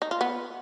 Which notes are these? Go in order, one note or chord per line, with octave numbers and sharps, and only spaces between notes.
D#4
F4
B3